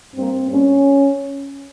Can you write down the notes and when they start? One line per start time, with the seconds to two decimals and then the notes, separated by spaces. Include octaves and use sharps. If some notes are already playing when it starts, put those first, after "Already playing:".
0.15 G2 G3 A#3 C4
0.49 G2 G3 A#3 C#4